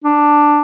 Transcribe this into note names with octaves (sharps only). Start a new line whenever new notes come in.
D4